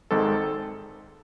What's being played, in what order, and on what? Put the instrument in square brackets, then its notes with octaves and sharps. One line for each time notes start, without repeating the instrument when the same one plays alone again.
[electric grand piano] G#1 G#2 D#3 G#3 C4 A4